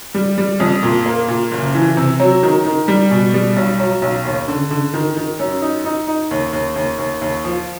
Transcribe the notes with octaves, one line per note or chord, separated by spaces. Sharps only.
G3
G3
F2
A#2
A#3
A#2
F#1
E3
C3
F#3
D#3
D#3
G3
B2
G3
B1
F#3
B1
D#2
D3
D3
D#3
D#3
F#2
D#4
D#4
D#4
D#2
D#2
D#2
D#2
D#2
F3